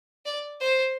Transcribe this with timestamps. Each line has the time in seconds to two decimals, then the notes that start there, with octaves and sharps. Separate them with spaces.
0.25 D5
0.60 C5